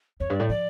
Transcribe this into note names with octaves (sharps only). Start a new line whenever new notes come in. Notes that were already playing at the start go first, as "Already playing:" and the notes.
F2 C#5
G2
A2 D5
F3 D5